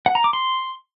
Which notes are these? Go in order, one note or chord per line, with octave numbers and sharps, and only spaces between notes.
F#5
A#5
D6
C6